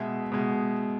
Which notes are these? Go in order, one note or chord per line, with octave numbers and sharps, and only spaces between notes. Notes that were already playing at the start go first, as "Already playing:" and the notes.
Already playing: B2 G#3 E5
B2 G#3